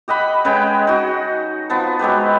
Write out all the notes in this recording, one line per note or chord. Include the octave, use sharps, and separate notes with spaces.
G4 D#5 F#5 B5
C#3 G#3 B4 G5
D#4 F#4
F3 B3 A5
F#3 G#3 G4 B4